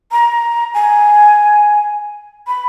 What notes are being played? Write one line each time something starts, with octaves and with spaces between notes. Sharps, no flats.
A#5
G#5
B5